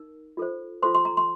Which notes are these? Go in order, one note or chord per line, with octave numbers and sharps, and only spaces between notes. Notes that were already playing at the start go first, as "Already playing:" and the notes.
Already playing: D#4 A#4
F4 A4 C5
F4 A4 C5 C6
C6
A#5
C6